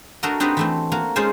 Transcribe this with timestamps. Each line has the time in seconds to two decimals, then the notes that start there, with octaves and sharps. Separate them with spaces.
0.23 A3 D4 F#4 A4 A#4 D#5
0.40 C4 D4 D#4 F#4 G4 B4
0.57 E3 A3 C4
0.92 A#3 F#4
1.16 G#3 C#4 D#4 F4 C5 G#5